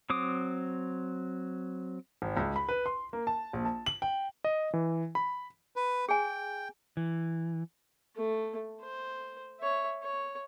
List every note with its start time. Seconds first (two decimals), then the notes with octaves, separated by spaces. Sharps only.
0.10 F#3 C4 D6 D#6
2.22 G#1
2.37 C#2
2.56 B5
2.69 B4
2.86 C6
3.13 A#3
3.27 A5
3.53 A#1
3.65 A5
3.86 F#7
4.02 G5
4.44 D#5
4.74 E3
5.15 B5
5.76 B4
6.09 G#4 G5 G#5
6.97 E3
8.16 A3
8.81 C5
9.60 C#5 E5
10.03 C#5